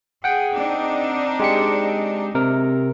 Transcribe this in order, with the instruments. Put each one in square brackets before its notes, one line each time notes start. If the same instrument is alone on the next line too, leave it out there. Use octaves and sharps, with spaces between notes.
[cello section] G#4 [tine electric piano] F#5 G5
[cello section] C4 D4 D#4
[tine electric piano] G#3 G4 C#7
C3 A#4